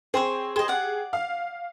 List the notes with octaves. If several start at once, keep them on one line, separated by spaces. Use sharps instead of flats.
C4 G#4 C5 C#5
G4 G#4 C5 D#5
D5 F#5
F5